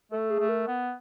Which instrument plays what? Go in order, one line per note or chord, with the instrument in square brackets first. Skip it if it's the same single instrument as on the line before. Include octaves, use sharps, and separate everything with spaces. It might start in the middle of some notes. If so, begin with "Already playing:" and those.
[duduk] A3 [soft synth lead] A4
[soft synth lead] G#4
[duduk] A3
[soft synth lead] A#4
[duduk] B3